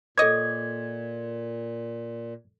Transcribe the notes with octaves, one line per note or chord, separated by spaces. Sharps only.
A#2 A4 C#5 D#5 D6 G#6